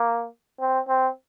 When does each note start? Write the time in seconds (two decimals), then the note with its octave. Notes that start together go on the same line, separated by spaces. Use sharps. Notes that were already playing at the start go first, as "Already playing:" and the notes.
Already playing: A#3
0.60 C4
0.88 C4